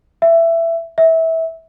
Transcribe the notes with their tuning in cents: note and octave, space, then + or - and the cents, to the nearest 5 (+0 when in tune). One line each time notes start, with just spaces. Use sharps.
E5 +15
E5 -20